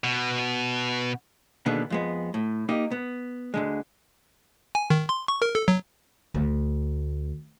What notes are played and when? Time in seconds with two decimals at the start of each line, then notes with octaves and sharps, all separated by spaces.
0.04 B2
1.66 B2 D3 D#3 A#3 B3 G#4
1.90 F2 G#3 B3
2.34 A2
2.69 A#3 D#4 G4
2.91 B3
3.54 D2 D3 G#3
4.75 G#5
4.90 D#3
5.09 C6
5.28 C#6
5.42 A#4
5.55 A4
5.68 F#3
6.34 D2